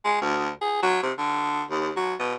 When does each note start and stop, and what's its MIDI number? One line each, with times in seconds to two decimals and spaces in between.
0.05 0.18 56
0.21 0.49 38
0.61 0.78 68
0.82 1.01 54
1.03 1.12 48
1.18 1.62 50
1.70 1.91 39
1.97 2.14 54
2.19 2.34 47